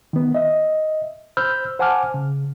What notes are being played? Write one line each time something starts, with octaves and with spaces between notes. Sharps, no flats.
D#3 B3
D#5 E5
C5 B5 E6 F6 G6
C5 F#5 G#5 A5 D6 F6
C#3